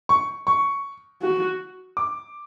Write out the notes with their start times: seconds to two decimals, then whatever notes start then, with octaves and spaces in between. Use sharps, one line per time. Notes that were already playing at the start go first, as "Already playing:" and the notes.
0.09 C#6
0.47 C#6
1.22 F#4
1.97 D6